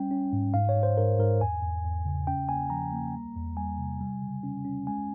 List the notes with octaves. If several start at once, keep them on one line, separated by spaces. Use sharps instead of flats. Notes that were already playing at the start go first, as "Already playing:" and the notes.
Already playing: G3 C#4 G5
C#4
G#2
G#2 F5
C#5
G#2
C5
G#2 A#4
G#2 A#4
E2 G#5
E2
E2
C#3
C#4 G5
A#3 G#5
F3 A#5
A#3
G3
E2
G3 G#5
C3
G3
C#3
C#4
C#4
G#3 G#5